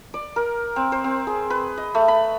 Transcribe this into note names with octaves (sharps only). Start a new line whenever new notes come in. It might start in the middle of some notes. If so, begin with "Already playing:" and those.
D5
A#4
C4
C5
C4
G#4
B4
D#5
A3
B5